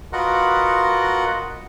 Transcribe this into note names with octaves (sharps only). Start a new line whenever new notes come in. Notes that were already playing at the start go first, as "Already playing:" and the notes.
F4 F#4 A#4 B4 D#5 F#5